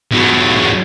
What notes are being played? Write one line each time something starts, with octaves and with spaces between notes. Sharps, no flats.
E2 F#3